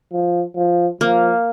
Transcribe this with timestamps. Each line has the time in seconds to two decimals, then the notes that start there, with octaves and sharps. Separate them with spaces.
0.13 F3
0.57 F3
1.01 F3 A#3